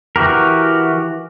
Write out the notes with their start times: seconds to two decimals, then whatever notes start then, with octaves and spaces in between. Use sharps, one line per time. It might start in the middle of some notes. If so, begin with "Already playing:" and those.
0.16 E3 F#4 G4 A#4